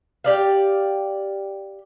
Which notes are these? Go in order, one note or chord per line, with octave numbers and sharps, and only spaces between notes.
G4 D5 F5